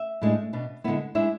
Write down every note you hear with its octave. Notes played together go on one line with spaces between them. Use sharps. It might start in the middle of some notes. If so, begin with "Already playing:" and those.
Already playing: E5
A2 G#3 D4
B2 B3 D4
D3 G#3 B3 E4
G#3 D4 E4 E5